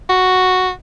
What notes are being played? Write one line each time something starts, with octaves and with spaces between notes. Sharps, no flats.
F#4